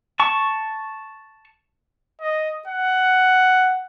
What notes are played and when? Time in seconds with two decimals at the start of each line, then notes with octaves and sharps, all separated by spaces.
0.20 A5 C#6
2.22 D#5
2.67 F#5